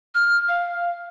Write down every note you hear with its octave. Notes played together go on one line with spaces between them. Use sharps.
F6
F5